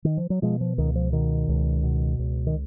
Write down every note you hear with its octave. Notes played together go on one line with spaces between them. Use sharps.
D#3
F3
F#3
B2 F3 G#3
F3
C#2 D#3
F3
B2 D#3
C#2
B2
C#2
D#3